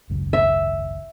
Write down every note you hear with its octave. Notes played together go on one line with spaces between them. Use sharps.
G#1 C#2 F#2
E5